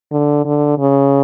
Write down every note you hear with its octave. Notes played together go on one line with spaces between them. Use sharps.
D3
D3
C#3